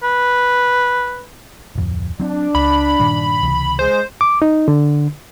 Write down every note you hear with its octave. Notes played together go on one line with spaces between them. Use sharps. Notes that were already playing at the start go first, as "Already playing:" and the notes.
B4
D1 F2
F#3 C4 D4
C#2 B5
G2 A#2 D#3
C#2 C3 E3
G#3 C5
D6
D#4
D3